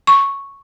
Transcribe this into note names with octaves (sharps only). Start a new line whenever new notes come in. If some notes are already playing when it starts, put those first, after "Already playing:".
C#6